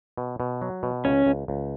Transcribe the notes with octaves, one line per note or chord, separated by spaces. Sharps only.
B2
B2
F#3
B2
C#2 C#4
C#2
C#2